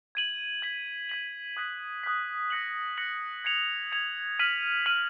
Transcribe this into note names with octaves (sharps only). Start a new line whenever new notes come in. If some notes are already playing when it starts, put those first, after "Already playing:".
G#6 D#7 F#7
G#6 B6 F#7
G#6 B6 F#7
D#6 F#6 B6
D#6 F#6 B6
F#6 A#6 C#7 F#7
F#6 A#6 C#7 F#7
G#6 C#7 F7
G#6 C#7 F7
F6 B6 D#7 F#7
F6 B6 D#7 F#7